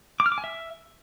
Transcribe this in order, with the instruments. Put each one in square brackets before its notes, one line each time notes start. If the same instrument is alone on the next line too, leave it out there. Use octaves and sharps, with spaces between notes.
[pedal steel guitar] D6
F6
D6
G#5
E5